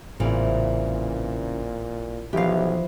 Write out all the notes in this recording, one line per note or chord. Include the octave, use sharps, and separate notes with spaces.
A1 A#2 C#3 E3 C4 E4
B1 E3 F3 G4 F5